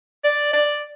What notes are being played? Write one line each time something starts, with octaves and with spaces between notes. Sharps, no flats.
D5
D5